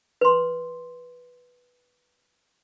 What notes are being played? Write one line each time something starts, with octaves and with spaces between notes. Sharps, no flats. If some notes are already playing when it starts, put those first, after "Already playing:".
B4 C6